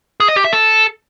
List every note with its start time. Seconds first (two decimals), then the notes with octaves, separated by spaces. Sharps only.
0.20 G#4
0.28 D#5
0.36 G4
0.45 E5
0.53 A4